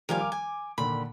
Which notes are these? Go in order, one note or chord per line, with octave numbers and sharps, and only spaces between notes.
D#3 F3 G3 A#4 F5 G#5
D6
G#5
A#2 D3 D#3 B5